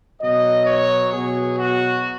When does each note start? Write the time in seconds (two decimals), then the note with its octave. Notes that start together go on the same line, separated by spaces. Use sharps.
0.20 B2 F#3 D#5
0.66 C#5
1.11 B2 F#3 G#4
1.58 F#4